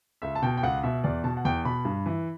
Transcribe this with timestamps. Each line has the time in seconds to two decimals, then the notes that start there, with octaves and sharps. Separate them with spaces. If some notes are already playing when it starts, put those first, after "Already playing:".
0.22 C#2 E5
0.35 A5
0.42 B2 G5
0.57 G5
0.63 C#2 F#5
0.83 B2 E5
1.04 E2 D5
1.24 B2 A5
1.37 F#5
1.45 E2 G5
1.65 B2 B5
1.85 G2
2.06 E3